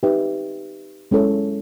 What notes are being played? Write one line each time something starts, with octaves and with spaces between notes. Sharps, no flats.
D#4 G4 B4 E5 G5
G#3 C#4 E4 A4 C#5